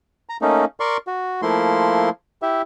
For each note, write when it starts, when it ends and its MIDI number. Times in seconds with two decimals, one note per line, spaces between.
0.29 0.37 82
0.42 0.65 57
0.42 0.65 58
0.42 0.65 61
0.42 0.65 63
0.80 0.97 70
0.80 0.97 74
0.80 0.97 84
0.80 0.97 85
1.07 1.41 66
1.42 2.09 53
1.42 2.09 57
1.42 2.09 58
1.42 2.09 64
1.42 2.09 84
2.42 2.62 64
2.42 2.62 67
2.42 2.62 76